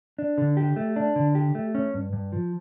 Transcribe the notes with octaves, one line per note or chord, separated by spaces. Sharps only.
D4
D3
G4
A3
D4
D3
G4
A3
C#4
G2
G2
F3